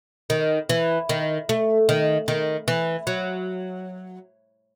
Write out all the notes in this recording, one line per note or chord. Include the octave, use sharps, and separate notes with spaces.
D#3
E3
D#3
A3
D#3
D#3
E3
F#3